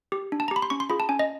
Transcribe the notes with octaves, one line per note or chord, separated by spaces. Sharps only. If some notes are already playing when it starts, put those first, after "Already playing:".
G4
D4
A5
A#5
G4 B5
C6
C#4 C#6
C6
F4 G#4 B5
A5
C#4 G#5
D#5